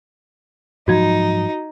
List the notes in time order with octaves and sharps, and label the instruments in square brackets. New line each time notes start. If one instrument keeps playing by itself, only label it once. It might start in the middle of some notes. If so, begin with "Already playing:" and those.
[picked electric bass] G#2 F3 F#3 [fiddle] D#4 [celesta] F#4 G#6